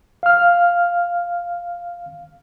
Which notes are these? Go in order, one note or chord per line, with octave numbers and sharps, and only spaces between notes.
F5 F6